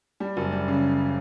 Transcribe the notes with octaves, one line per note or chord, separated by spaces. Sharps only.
G3
F#1
G3
C#3